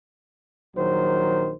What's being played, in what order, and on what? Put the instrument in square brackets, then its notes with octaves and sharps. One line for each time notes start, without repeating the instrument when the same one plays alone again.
[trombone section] A#1 D#3 F#3 C5